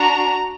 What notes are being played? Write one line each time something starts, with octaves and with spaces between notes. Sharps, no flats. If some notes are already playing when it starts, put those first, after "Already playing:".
Already playing: D4 F#4 A#5